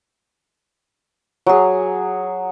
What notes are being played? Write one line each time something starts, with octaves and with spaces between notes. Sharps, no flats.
F#3 G#4